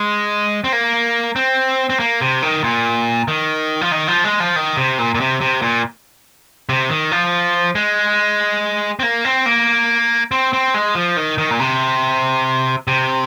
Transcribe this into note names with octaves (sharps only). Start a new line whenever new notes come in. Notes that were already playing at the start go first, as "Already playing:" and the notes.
Already playing: G#3
C4
A#3
C4
C4
A#3
C3
D#3
A#2
D#3
F3
D#3
F3
G#3
F3
D#3
C3
A#2
A#2
C3
C3
A#2
C3
D#3
F3
G#3
C4
A#3
C4
A#3
C4
C4
G#3
F3
D#3
D#3
A#2
C3
C3